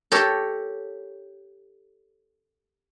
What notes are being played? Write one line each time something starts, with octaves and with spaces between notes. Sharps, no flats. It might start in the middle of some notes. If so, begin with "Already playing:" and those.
G4 A4 A#4 C#5